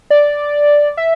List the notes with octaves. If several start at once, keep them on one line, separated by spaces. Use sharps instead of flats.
D5
E5